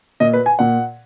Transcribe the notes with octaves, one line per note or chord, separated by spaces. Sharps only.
A#2 D#5
B4
G#5
A#2 F#5